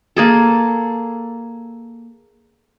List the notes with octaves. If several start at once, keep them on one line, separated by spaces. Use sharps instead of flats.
A#3 G#4 A4